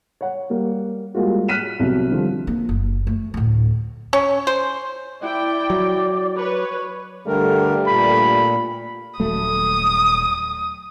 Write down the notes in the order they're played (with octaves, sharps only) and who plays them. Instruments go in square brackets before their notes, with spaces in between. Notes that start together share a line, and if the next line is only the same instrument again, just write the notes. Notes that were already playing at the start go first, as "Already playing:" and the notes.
[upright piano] C#5 F#5
G3 A#3
G3 G#3 A#3 F4 F#4
F6 F#6 B6 D#7 E7
C2 B2 F#3
D3 F3 G3
[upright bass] A#3
F#1
A3
D2 A2
[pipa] C#4
C5
[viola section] E4 G5 [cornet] D5
[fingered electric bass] F#3
[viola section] B4 C#5
[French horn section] G2 G3 A3 [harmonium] D3 A#4
[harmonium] A#2 [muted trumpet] B5
[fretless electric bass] D#1 F#3 A3 [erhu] D#6